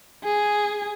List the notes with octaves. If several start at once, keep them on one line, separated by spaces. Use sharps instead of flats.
G#4